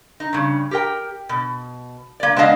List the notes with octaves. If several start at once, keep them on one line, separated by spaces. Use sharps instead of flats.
D#4
G2 C#3
G4 A#4 G5
B2
A#3 D5
G#3 B3 D4 D#5 F5